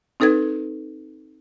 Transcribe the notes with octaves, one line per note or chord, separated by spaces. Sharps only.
C4 D#4 A4 B4 G#6